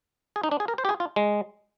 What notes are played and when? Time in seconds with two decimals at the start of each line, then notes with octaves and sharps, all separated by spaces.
0.36 G#4
0.43 D#4
0.51 D4
0.60 G#4
0.68 A#4
0.78 C5
0.85 G4
0.89 G#4
1.00 F4
1.16 G#3